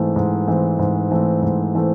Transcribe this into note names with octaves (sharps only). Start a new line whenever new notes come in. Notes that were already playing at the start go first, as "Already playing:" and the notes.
Already playing: G#2 E3 A3 C4
G#2
E3 A3 C4
G#2
E3 A3 C4
G#2
E3 A3 C4